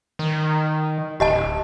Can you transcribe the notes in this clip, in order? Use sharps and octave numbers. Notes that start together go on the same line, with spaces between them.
D#3
D1 G4 D#5 A5